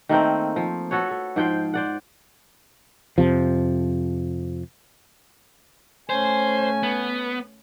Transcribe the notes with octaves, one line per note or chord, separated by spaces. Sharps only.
D#3 A3 A#3 C4
F3
F#4 A4 B4 C#5
A4
G#2 F3 C5 G5
C5 D5 F#5
F2 C3 F3
A3 C#4 C5 G#5
B3